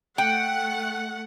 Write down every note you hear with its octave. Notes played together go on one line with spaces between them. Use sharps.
A3 F#5 G5